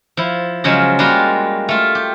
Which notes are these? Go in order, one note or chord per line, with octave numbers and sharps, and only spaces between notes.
F3 E4
C#3 F3 F#3 G#3
G3 G#3 A#3 F4 F#4
A3 F4
G4